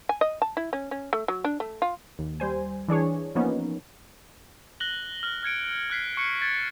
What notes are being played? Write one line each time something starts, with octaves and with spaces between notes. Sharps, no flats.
G#5
D#5
A5
E4
C#4
C#4
A3
F#3
D4
A3
F4
D#2
G3 C5 G#5
E3 D4 G#4 C#5
F3 A#3 B3 C#4 D#4
F#6 A#6 F#7 G7
F6 F#7
F6 G#6 C#7 D7
F6 F#6 B6 C7
C#6 C#7
G#6 A6